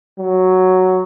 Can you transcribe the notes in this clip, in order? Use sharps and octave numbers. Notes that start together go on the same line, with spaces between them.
F#3